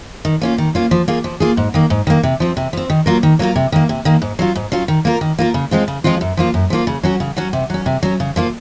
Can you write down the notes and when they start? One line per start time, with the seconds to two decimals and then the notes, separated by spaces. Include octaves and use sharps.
0.25 D#3
0.42 A#3 C#4 F4
0.58 D#3
0.75 A#3 C#4 F4
0.91 F3
1.08 A#3 F4 G#4
1.24 F3
1.40 A#3 F4 G#4
1.57 G#2
1.74 D#3 A#3
1.90 G#2
2.07 D#3 A#3
2.23 C3
2.40 F3 C4
2.57 C3
2.73 F3 C4
2.90 D#3
3.06 F#3 A#3 F4 A#4
3.23 D#3
3.39 F#3 A#3 F4 A#4
3.56 C3
3.72 D#3 A#3
3.89 C3
4.05 D#3 A#3
4.22 G#2
4.39 F#3 C#4 F4
4.55 G#2
4.72 F#3 C#4 F4
4.88 D#3
5.05 A#3 F4 A#4
5.21 D#3
5.39 A#3 F4 A#4
5.54 C#3
5.71 F3 G#3 C4 F4
5.88 C#3
6.04 F3 G#3 C4 F4
6.21 F#2
6.37 F3 A#3 F4
6.54 F#2
6.70 F3 A#3 F4
6.87 C#3
7.03 F#3 C#4 F#4
7.20 C#3
7.37 F#3 C#4 F#4
7.53 C3
7.70 F#3 C#4
7.86 C3
8.03 F#3 C#4
8.20 C#3
8.36 F3 A#3 F4